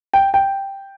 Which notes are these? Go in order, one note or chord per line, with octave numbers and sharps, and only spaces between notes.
G5
G5